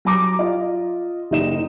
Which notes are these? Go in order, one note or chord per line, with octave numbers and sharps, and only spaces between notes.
F#3 F#4 A#5 D6
F4 D#5
F#1 D#4 E7